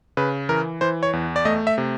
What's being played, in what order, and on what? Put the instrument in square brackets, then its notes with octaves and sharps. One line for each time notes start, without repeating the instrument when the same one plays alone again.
[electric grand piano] C#3 B4
E3 A#4
E3 C5
C#5
E2
D5
A3 D#5
E5
C3